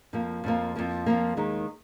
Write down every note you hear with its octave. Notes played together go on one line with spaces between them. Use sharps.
F2 F3 A#3
F2 F3 A#3
F2 F3 A#3
F2 F3 A#3
D#2 D#3 G#3 D#4